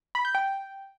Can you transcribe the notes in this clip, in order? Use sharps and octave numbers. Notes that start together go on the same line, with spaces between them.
B5
G6
G5